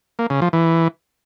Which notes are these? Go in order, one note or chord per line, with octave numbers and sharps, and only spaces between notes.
A#3
C#3
F3
E3